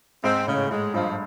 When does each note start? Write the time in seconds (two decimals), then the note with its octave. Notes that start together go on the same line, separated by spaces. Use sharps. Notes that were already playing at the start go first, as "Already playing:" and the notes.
0.23 G#2 C4
0.47 A2 C#3
0.70 G#2 G#3
0.93 G2 F3